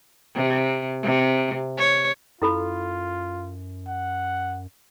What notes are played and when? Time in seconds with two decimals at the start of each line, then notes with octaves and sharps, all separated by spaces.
0.35 C3
1.02 C3
1.77 C#5
2.42 F#2 E4 F4 A4 B5
3.87 F#5